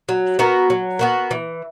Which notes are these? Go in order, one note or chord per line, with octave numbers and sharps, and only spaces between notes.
F#3
B3 F#4 A#4
F#3
B3 F#4 A#4
E3